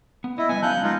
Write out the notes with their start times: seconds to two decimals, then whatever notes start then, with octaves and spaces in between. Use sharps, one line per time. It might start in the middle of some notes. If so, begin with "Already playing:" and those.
0.24 B3
0.38 E4 D#5
0.49 G3 G#3 B3 G#5
0.62 F#3 B3 C#4 F5 A5 F#6 G6
0.83 G#3 B3 D#4 F4